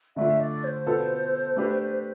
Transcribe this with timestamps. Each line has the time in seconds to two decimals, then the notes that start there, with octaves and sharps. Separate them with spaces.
0.16 D3 A3 D4 F4 E5
0.40 D5
0.64 C5
0.86 B2 B3 F4 A4
1.57 A3 D4 G4 B4